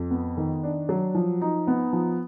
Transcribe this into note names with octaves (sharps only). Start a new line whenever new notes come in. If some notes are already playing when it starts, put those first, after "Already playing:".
Already playing: F2
B3
D#3
D4
F#3
F3
D#4
B3
F3